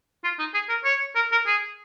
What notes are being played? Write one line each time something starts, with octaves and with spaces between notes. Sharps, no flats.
F4
D#4
G#4
A#4
C#5
A#4
A#4
G#4